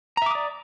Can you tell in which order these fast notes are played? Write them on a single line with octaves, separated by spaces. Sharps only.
A#5 E5 D6 D#6 D5